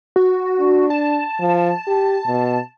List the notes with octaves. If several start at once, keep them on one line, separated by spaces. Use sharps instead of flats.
F#4
D4
A5
F3
G4
B2